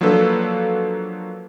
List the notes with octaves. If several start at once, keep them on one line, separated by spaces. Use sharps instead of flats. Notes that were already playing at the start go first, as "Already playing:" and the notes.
F3 F#3 A#3 D4 A4 B4